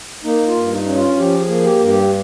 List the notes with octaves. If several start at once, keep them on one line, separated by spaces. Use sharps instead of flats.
A#3 D#4
F4
G2
D#4
C#4
F4
F3 G4
G#4
A#3
G4
G2
G4